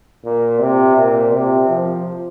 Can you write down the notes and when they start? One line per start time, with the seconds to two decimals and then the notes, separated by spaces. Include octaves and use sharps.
0.25 A#2
0.60 C3
0.97 A#2
1.33 C3
1.69 F3